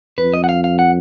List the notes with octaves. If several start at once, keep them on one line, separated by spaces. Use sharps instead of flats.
F2 B4
D#5
F#5
F5
F5
F#5